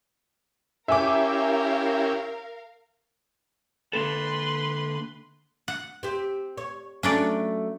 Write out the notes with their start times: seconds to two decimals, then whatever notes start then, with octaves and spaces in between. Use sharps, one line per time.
0.88 C#4 E4 G4 A#4 E5 F5 G#5 D6
3.93 D3 A#3 A4 B4 C6
5.68 F#5
6.03 C4 G4
6.57 C#5
7.03 F#3 A3 C#4 D4 D5